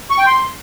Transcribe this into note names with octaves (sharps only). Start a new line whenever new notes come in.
C#6
G5
C6